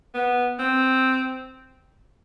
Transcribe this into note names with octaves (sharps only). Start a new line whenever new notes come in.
B3
C4